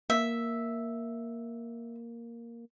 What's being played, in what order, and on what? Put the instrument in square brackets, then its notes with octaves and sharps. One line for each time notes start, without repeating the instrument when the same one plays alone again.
[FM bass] A#3 [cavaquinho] E5